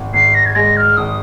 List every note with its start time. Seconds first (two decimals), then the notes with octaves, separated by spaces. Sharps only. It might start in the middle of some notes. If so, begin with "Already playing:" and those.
Already playing: G#1
0.14 G#1 C7
0.35 A#6
0.46 G#6
0.55 G#3 A#6
0.77 F6
0.97 G#1 D#6